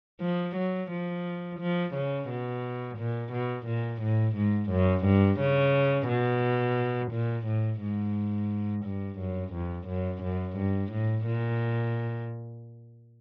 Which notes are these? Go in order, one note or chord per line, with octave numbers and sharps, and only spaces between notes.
F3
F#3
F3
F3
C#3
B2
A#2
B2
A#2
A2
G#2
F#2
G2
C#3
B2
A#2
A2
G#2
G2
F#2
F2
F#2
F#2
G2
A2
A#2